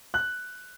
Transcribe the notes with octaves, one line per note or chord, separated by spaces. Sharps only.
F#6